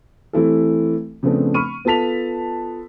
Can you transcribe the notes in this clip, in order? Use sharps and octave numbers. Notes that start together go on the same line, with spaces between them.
E3 A3 C4 E4 G4 A4
C#3 F3 A3 B3 C4 D4
B5 C#6 F6 D#7
B3 F4 A4 A5 B6 F7